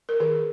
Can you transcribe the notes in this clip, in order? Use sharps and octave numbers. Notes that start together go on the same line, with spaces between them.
A#4
D#3 G#4